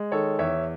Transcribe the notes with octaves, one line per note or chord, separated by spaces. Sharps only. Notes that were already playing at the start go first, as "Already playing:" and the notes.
Already playing: G#3
D#3 A4 C#5
E2 C#5 E5